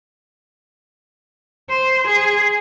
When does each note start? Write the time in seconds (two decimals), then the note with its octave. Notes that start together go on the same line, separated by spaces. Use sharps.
1.70 C5
2.07 G#4